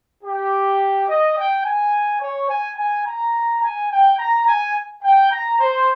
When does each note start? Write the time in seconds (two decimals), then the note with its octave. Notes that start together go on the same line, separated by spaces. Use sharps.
0.23 G4
1.08 D#5
1.36 G5
1.65 G#5
2.21 C#5
2.50 G#5
2.77 G#5
3.06 A#5
3.62 G#5
3.91 G5
4.18 A#5
4.47 G#5
5.03 G5
5.31 A#5
5.60 C5